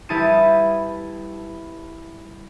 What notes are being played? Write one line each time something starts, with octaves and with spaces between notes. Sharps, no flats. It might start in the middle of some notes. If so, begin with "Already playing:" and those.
G3 E4 B4 A5 D#6 D#7